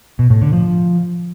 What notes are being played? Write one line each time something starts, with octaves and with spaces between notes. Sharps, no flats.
B2
A2
D3
F3